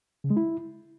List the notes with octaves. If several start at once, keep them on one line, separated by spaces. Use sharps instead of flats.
C#3
G#3
E4